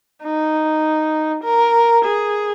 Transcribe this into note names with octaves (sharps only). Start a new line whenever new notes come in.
D#4
A#4
G#4